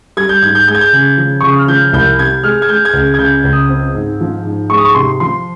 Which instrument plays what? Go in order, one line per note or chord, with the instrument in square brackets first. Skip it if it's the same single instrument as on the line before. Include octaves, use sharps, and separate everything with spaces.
[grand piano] G3 G#6
G6
G#2 G#6
G6
G#3 G6
G#6
G6
C#3
F3
C#3 C#6
D#6
F6
F3 G6
C2 G6
C3 G#6
G#3 F6
G#6
G#3 G6
G#6
C#2
G#6
C#3 G6
C#2
D#6
C4
G#2
F3
G#2
G#3 C#6
D#6
C#6
C3 C6
F3 C6